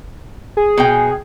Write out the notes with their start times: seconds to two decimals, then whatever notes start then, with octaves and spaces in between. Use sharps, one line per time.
0.57 G#4
0.78 B2 G5